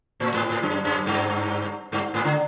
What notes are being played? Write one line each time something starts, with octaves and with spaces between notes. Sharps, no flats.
A2
G#2
G#2
F#2
F#2
G2
G2
G#2
D3